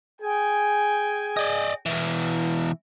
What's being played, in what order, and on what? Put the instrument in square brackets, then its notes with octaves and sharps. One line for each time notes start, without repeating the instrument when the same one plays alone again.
[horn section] G#4 G5 G#5
[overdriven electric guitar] D5 D#5
B2 E3